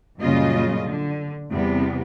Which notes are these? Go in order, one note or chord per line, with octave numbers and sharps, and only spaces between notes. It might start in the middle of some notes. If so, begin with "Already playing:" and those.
F#2 A#2 C#3 G3 F4 D#5
D3
E2 C3 G3 B3